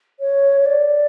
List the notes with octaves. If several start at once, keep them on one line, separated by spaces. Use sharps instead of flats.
C#5
C#5
D5